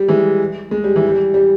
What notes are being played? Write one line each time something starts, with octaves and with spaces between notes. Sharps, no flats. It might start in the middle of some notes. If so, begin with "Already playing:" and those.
Already playing: G3
E3 G#3
G#3
G3
E3
G3
G3